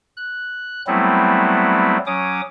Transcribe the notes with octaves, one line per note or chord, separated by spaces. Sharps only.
F#6
F#3 G3 A3 B3 C4 E4
F#3 C#4 D6 D#6